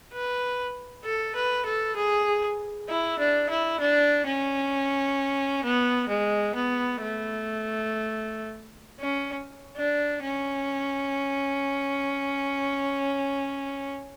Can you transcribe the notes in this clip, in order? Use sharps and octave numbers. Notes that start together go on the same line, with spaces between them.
B4
A4
B4
A4
G#4
E4
D4
E4
D4
C#4
B3
G#3
B3
A3
C#4
D4
C#4